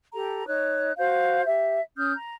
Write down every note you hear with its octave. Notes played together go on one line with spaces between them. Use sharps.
G4 A4 A#5
D#4 C#5 F#6
F#4 C5 F5 G6
G4 E5
C#4 D#6 F6 G6
A#5